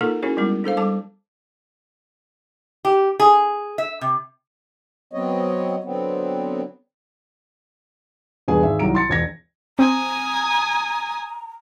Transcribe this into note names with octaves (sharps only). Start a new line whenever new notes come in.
A#3 D#4 F4 A4 A#4
C#4 E4 F#4 G#4 A#4 C#5
G3 G#3 B3 E4 A#4
D4 A4 C5 F5
G3 A4 A5 D6
G4
G#4
E5
C3
F#3 B3 C4 C#5 D#5
D3 F#3 B3 C4
E1 G2 B3 G#4 G#5
G#1 G#4 E5
C2 D#3 F#3 A#5 D7
C6 A6 C#7
E1 G#6 A#6
C4 G#5 A#5 D#6